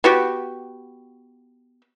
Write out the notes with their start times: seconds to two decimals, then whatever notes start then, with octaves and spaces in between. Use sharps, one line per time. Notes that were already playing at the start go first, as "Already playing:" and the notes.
0.04 B3 F#4 G4